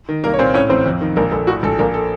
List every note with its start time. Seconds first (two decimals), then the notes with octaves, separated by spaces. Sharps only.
0.09 D#3
0.23 C2 A#3 A#4
0.34 C#5
0.39 A#2 C4 C5
0.54 A2 C#4 C#5
0.70 A1 C4 C5
0.86 F2
1.01 D#3
1.16 A#1 A#3 A#4
1.32 A#1 A4
1.47 A2 F#4
1.63 A#1 A4
1.79 A#1 A#3 A#4
1.94 A4